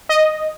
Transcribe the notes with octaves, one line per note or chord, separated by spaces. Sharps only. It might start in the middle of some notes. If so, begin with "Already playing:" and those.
D#5